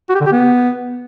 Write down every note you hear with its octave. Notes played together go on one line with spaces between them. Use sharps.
F#4
G4
D3
G4
B3